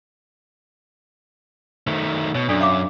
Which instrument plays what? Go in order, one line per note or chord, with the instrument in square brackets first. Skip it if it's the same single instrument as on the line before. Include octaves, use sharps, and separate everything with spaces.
[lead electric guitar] D#3 A3 [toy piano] C5
[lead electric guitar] B2 [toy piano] C#5
[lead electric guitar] F#2 [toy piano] D4 A4 D5
[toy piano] E5 F5 D6